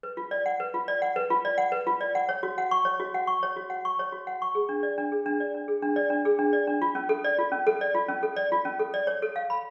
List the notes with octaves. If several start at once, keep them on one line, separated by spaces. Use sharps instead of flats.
B4
F4
D5
F#5
B4
F4
D5
F#5
B4
F4
D5
F#5
B4
F4
D5
F#5
C#5
F#4
F#5
C#6
C#5
F#4
F#5
C#6
C#5
F#4
F#5
C#6
C#5
F#4
F#5
C#6
G#4
D4
D5
D4
G#4
D4
D5
D4
G#4
D4
D5
D4
G#4
D4
D5
D4
F4
C#4
A4
D5
F4
C#4
A4
D5
F4
C#4
A4
D5
F4
C#4
A4
D5
C#5
A4
F5
B5